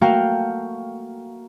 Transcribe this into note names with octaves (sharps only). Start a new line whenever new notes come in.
A3 A#3 F#4 A#4 F5 G5